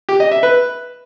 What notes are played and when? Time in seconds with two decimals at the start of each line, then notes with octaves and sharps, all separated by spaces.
0.09 G4
0.20 D#5
0.31 E5
0.43 B4